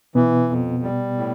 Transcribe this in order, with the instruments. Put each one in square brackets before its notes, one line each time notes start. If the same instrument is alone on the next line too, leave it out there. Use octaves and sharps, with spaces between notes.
[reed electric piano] B2 B3 [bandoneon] E3
[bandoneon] F2
G3
A2